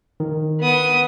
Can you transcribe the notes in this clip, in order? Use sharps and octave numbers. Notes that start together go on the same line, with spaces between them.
D#3
B3 D#6